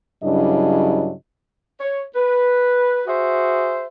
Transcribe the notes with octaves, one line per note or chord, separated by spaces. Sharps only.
G2 C#3 F#3 D4 E4 D#5
C#5
B4
F#4 G#4 C5 E5